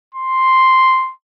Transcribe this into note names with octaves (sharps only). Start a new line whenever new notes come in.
C6